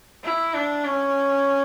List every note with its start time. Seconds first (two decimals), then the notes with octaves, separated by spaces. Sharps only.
0.24 E4
0.54 D4
0.85 C#4